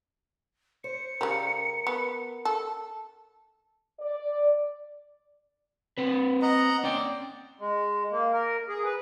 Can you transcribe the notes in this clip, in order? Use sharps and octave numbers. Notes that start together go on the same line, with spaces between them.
C5 C#7
C#3 G3 A#4
B3
A4
D5
C4 B4
D#5 F#5 A#5
C#4 D5 G5
G#3
A#3
A#4
G#4
B4